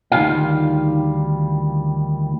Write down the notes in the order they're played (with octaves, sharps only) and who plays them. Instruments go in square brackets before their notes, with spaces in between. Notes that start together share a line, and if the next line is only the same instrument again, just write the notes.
[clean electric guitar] D2 D#3 F#3 G3 F4 F5